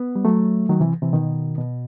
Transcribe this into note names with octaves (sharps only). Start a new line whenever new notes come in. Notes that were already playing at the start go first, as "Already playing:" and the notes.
Already playing: B3
G3
F#3 A3
D#3 F#3
C3 E3
C3 E3
B2 D#3
B2